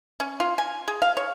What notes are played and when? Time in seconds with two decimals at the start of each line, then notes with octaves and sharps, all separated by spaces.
0.20 C#4
0.40 F4
0.58 G#5
0.88 G#4
1.02 F5
1.17 C#5